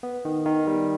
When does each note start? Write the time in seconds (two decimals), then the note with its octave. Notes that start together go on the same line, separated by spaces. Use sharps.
0.03 B3
0.25 D#3
0.46 D#3
0.67 G3